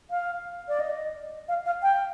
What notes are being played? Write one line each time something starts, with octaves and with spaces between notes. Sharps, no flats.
F5
D5
D#5
F5
F5
G5